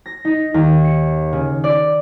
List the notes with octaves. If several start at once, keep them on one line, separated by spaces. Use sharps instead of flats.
A#6
D#4
D#2
C#7
C#3
D5